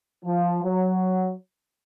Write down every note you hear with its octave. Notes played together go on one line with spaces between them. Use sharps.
F3
F#3